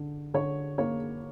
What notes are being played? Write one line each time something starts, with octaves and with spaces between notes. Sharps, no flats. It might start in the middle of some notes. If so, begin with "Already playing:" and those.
Already playing: D3
D3 C#5
A#3 C#5